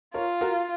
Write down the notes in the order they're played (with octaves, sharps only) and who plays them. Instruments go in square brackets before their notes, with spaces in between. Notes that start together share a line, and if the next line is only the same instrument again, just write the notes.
[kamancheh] F4 [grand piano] A#4 C#5
[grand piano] F#4 A#4